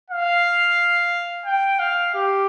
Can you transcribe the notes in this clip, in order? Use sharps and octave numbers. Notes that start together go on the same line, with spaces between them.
F5
G5
F5
G4